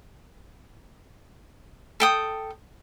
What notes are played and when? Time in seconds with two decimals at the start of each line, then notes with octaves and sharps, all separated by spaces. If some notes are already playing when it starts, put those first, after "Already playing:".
2.00 A4 G5 D#6